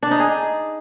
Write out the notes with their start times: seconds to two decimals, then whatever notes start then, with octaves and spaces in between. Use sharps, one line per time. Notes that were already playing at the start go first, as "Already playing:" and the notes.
0.03 D4
0.11 D#4
0.20 G#4